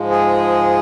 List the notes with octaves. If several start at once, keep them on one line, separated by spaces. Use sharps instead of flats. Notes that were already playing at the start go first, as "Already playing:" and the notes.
Already playing: G#2 F3 G#3
G#4